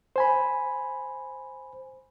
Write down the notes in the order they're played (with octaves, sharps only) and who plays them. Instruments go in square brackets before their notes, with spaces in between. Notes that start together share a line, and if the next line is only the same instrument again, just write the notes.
[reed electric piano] C5 G#5 B5